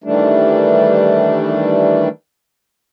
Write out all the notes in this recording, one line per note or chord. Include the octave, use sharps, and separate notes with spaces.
D#3 E3 G3 A3 D4